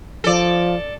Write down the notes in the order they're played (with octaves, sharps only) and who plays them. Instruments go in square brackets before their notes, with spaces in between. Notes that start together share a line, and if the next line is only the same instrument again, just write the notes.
[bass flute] F3 [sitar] A4 D5